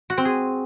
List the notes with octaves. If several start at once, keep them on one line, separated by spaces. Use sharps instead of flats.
F#4
C4
G#4